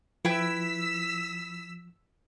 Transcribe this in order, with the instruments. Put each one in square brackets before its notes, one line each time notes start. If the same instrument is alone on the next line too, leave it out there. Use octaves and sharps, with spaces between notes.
[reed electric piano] F3 [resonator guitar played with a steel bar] E4 B4 G5 [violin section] E6 B6